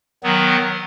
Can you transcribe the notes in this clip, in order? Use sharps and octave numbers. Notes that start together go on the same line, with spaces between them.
D#3 F#3 B3